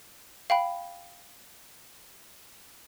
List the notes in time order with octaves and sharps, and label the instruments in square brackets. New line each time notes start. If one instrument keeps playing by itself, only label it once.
[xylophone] F5 G5 B5